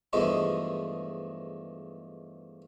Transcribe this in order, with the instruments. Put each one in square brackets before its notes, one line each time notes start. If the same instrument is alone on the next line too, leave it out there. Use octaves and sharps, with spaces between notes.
[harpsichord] E2 G2 F3 G#3 A3 D#4